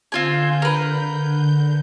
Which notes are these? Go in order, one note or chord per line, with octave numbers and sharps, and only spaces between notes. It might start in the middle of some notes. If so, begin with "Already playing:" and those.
D3 C4 F4 G#5 G6
A#4 B4